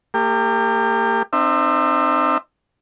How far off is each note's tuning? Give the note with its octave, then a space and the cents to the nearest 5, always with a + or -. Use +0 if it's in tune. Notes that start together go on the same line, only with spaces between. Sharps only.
A#3 -35 G4 +30
C4 +0 D#4 -40 E5 +15